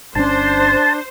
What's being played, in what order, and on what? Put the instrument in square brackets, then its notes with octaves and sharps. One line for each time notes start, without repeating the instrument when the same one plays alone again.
[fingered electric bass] G1 A#2 C#4 [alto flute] D4 [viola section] C5 [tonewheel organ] A5